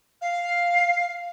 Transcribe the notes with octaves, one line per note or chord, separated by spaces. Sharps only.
F5